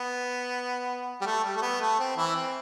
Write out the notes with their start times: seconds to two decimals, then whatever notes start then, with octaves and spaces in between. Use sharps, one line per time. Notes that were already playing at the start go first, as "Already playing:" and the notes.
Already playing: B3
1.21 G3
1.26 A3
1.44 G3
1.56 A3
1.62 B3
1.81 A3
1.99 C4
2.17 E3 E4
2.36 C4